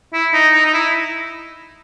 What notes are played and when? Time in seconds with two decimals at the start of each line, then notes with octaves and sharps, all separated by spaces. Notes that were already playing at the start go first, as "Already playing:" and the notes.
0.14 E4
0.33 D#4
0.54 D#4
0.67 D#4
0.74 E4